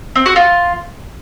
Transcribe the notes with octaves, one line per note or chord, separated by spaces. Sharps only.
C4
F#4
F4